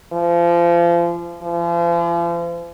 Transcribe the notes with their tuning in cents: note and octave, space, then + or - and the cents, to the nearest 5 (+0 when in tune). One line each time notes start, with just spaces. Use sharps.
F3 -30
F3 -40